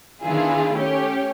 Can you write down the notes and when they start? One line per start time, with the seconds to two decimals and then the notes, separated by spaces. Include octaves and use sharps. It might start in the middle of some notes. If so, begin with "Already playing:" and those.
0.23 D#3 B3 D4 E4 F4 G#4
0.72 A3 C#4 G4 C#5